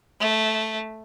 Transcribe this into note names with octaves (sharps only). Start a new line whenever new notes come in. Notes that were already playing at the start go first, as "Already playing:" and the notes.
A3